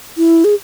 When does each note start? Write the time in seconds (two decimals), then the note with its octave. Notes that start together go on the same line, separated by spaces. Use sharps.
0.18 E4
0.44 G#4